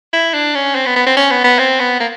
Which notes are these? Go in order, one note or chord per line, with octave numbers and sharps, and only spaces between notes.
E4
D4
C#4
C4
B3
B3
C4
C#4
B3
B3
C4
B3
A#3